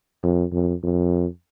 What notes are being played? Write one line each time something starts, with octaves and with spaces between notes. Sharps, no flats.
F2
F2
F2